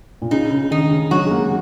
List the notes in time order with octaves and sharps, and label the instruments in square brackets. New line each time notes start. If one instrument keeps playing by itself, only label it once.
[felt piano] A#2
[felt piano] C#3 [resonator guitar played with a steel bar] D#4
[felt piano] C#3
[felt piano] D#3 [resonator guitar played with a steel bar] D#4
[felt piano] C#3
[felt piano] F#3 [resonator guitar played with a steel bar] F#4
[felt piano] G#3
A#3